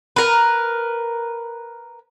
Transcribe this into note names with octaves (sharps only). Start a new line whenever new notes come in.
A#4 B4